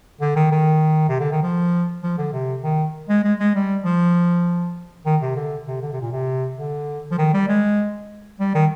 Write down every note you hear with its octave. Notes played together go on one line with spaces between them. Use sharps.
D3
D#3
D#3
C3
D3
D#3
F3
F3
D3
C3
D#3
G#3
G#3
G#3
G3
F3
D#3
C3
D3
C3
D3
C3
A#2
C3
D3
F3
D#3
G3
G#3
G3
D#3